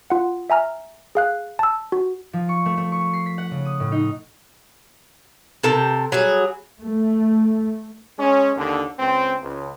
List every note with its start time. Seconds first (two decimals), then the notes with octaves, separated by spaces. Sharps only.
0.10 F4 F#5
0.50 E5 G#5 A#5 F6
1.15 G#4 F5 F#6
1.59 A5 E6
1.92 F#4
2.33 F3
2.49 C#6
2.66 A3
2.77 A3
2.92 C#6
3.13 C7
3.26 B6
3.38 F#5
3.51 C#3
3.65 D#6
3.80 A2
3.92 D#4
5.63 C3 A4 A#4 G5
6.12 F#3 G3 G#4
6.80 A3
8.17 G#3 C#4
8.55 D#2 D3
8.98 C#2 C4
9.40 C#2